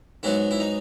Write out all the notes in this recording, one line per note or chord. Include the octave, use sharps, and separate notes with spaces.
G#2 F#3 B3 E4
E4
D#4